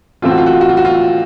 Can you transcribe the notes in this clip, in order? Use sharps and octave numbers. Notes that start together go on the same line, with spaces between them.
A2 E3 A3 C4 F4
F#4
F4
F#4
F4
F#4
F4
F#4
F4